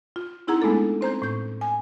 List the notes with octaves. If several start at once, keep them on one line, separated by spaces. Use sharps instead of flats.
F4
C4 D#4 E4 G#4 F#5 A#5
G#3 A3 B3 D4 A4
C4 C5 A#5 G6
A2 G6
G#5